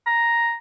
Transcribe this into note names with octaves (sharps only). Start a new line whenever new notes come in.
A#5